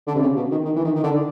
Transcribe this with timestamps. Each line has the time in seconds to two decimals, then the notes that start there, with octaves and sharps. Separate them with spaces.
0.07 D3
0.15 C3
0.22 C#3
0.36 B2
0.51 D#3
0.65 D#3
0.76 E3
0.85 D#3
0.96 D#3
1.04 D3